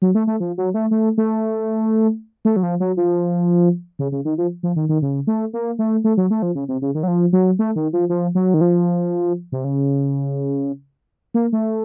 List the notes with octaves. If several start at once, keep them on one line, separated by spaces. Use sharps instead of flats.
F#3
A3
A3
F3
F#3
A3
A3
A3
A3
F#3
F3
F#3
F3
C#3
C#3
D#3
F3
F3
D#3
D#3
C#3
A3
A#3
A3
A3
F#3
A3
F3
C#3
C3
C#3
D#3
F#3
F3
F#3
A3
D#3
F3
F3
F#3
D#3
F3
C3
C#3
A#3
A3